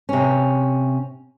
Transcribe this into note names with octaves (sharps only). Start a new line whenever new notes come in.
C3 C#4